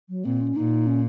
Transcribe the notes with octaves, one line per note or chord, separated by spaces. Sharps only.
F#3
A#2 C4
C#4
A#2 D#4
C#4